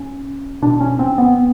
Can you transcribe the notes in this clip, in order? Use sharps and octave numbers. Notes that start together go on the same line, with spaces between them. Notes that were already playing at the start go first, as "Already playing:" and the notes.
Already playing: C#4
B2 D4
C#4
C4
B3